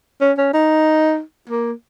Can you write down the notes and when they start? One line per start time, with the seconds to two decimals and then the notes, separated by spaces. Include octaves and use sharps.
0.21 C#4
0.38 C#4
0.54 D#4
1.49 A#3